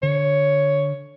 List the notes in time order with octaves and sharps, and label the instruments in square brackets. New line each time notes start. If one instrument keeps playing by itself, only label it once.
[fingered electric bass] D3 [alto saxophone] C#5